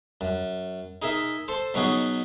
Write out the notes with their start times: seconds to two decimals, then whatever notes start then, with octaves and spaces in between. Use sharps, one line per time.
0.21 F#2
1.02 D#4 G#4 A#4 E5
1.48 A4 C5
1.74 B2 F#3 C#4 D#4 F#4 G#4